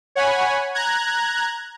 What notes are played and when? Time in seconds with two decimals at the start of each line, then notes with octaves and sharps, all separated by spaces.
0.15 C#5 F#5 G#5 B5
0.74 A#5 F#6 G#6